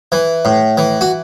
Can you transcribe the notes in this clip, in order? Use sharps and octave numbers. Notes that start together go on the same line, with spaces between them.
E3
A2
E3
F#4